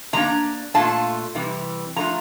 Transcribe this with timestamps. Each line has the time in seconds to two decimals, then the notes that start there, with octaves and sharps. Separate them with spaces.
0.13 C3 G3 A#3 D4 A#5
0.74 A#2 A3 D4 F4 A5
1.35 C3 E3 G3
1.96 F3 A3 D4 F4 A#5